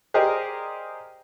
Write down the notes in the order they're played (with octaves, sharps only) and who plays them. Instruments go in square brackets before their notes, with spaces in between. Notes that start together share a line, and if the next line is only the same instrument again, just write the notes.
[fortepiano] G4 G#4 A#4 C5 D5 D#5